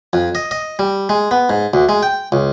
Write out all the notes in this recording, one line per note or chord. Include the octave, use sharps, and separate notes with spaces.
F2
D#5
D#5
G3
G#3
B3
G#2
D2
G#3
G5
C#2